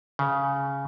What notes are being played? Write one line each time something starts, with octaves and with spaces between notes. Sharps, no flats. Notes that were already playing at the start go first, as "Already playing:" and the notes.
C#3